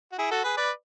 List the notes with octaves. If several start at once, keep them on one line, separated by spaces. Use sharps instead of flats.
F#4
E4 G#4
F#4 A4
G#4 B4
B4 D5